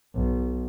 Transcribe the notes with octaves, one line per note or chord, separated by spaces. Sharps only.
B1